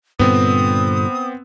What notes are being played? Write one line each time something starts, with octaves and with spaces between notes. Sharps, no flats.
G2 A#2 D3 B3 C4 D#6